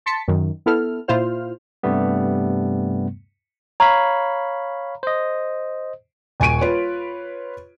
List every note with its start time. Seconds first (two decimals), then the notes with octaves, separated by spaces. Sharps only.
0.06 A5 C6 A6 B6 C#7
0.28 F#2 D#3
0.66 B3 E4 A4 F6
1.08 A#2 E4 F4 C5 F6
1.83 G2 C3 G3 A3 B3
3.80 C#5 F5 A#5 B5
5.03 C5 D#5
6.40 D#1 G#5 C#6 D7 D#7
6.61 F4 B4 C#5